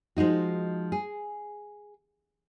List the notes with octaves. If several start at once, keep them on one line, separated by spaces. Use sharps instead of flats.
F3 G#3 D#4 F#4
G#4